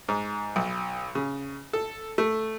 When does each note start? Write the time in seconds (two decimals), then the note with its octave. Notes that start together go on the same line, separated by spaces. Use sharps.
0.09 G#2
0.56 B1
1.15 C#3
1.73 A4
2.18 A3